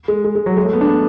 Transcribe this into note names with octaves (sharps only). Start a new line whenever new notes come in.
G#3
G#3
G#3
F#3
G#3
A3
B3
D4
B3